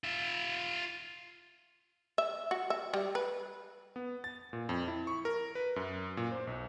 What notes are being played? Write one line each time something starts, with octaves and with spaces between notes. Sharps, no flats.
F4 E5
E5
F#4
E5
G3
B4
B3
A6
A#2
F2
E4
C#6
A#4
B4
F#2
A#2
C5
B1